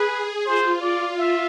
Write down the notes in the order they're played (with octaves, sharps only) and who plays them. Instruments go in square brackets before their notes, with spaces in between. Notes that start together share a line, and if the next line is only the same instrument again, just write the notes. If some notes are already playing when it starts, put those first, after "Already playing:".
Already playing: [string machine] G#4 [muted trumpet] B4
[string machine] F4 [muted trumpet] C5
[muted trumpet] D5
E5